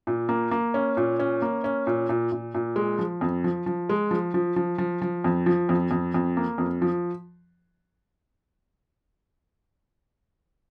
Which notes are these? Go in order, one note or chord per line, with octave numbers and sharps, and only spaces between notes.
A#2
A#3
A#3
C#4
A#2
C#4
A#3
C#4
A#2
A#2
A#2
A#2
G#3
F3
F2
F3
F3
G#3
F3
F3
F3
F3
F3
F2
F3
F2
F2
F2
A#3
F2
F3